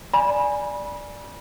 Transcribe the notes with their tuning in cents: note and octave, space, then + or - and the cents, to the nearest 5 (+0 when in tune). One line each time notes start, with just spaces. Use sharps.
D5 +0 G#5 +0 B5 -30